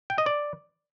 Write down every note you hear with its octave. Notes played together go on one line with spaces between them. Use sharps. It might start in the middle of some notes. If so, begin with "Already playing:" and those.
G5
D#5
D5